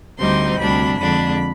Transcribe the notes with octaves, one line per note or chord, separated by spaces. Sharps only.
D2 D3 G3 C4 D#4 C6
D2 C3 G3 D4 B5
F2 D3 G#3 D4 B5